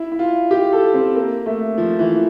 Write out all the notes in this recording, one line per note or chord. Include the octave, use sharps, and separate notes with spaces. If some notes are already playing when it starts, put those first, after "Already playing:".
Already playing: E4
E4
F4
G4
A4
C4
A#3
A3
F3
E3